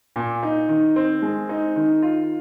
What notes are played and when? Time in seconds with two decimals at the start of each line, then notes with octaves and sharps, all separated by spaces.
0.16 A#2
0.43 D#4
0.69 D#3
0.96 C4
1.22 G#3
1.49 D#4
1.76 D#3
2.02 F4